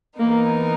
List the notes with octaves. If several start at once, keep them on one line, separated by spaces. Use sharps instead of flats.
E3 A#3 B3 D#4 A#4